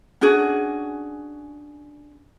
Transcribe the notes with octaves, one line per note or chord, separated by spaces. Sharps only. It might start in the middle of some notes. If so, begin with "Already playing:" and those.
C#4 D4 F#4 G#4